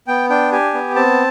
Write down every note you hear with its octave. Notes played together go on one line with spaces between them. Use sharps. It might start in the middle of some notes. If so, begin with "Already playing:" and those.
B3 G5
D4 G5
G4 G#5
B3
C4 A5